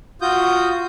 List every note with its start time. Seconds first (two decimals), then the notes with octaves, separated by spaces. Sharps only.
0.22 F4 F#4 D#6 G6